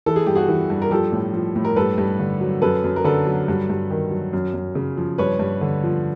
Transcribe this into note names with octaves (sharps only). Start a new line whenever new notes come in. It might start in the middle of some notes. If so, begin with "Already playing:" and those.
E3 A4
G#4
G2 G4
F#4 G#4
E3
G2
A#4
F3 G4 A4
A2
F3
A2
A#4
G2 A4 B4
G2
D3
F#3
F#2 A4 B4
F#2
A#4
D3 A4 B4
F#3
G2
G2
D#3
F#3
F#2
F#2
C#3
F3
G2 B4 C#5
G2
D3
F3